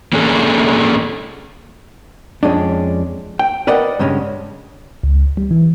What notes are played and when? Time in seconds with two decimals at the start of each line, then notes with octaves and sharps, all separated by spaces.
0.13 A#3 C#4 D4 G#4 A4
2.43 F2 G#3 C#4 D4
3.39 G5
3.67 A#4 B4 D5 D#5 F#5 G5
3.99 G2 C#3 G#3 C#4
5.04 C#2
5.37 G3
5.51 E3